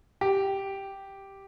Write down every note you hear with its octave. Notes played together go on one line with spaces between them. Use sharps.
G4